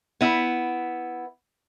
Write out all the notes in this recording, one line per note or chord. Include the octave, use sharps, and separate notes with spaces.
B3 E4